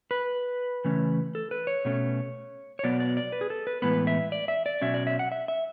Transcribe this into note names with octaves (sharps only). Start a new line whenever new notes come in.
B4
C#3 E3 A3 C#4
A4
B4
C#5
B2 A3 C#4
C#5
B2 F#3 B3 D5
D5
D5
B4
G#4
A4
B4
A2 E3 G#3 B3 B4
E5
D5
E5
D5
B2 F#3 C#4 E5
D5
E5
F#5
E5
E5